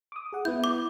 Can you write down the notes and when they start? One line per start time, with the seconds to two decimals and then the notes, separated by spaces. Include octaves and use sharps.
0.12 D6 D#6
0.33 G#4 F#5
0.45 B3 E4 G6
0.64 D6